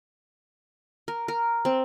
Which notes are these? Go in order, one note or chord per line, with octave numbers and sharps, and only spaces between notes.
A#4
A#4
C4